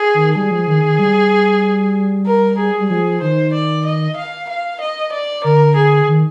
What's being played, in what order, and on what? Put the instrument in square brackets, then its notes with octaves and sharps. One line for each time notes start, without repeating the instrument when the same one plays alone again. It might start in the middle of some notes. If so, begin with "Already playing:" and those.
Already playing: [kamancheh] G#4
[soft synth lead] D#3
[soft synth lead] G3 [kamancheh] G#4
[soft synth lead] F3
D#3
D#3
G3
[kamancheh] A#4
G#4
[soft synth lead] G3
[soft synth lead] F3 [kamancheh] G#4
[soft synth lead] D#3 [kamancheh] C5
[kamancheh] D5
D#5
F5
F5
D#5
D5
[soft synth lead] D3 [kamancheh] A#4
[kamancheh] G#4
[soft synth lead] D#3